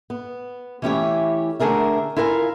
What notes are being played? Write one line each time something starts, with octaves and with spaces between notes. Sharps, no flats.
B3
E3 A3 C#4 E4 G4 C#5
D3 A3 D4 G#4 A#4 E5
E4 F4 A#4 F5 F#5 G#5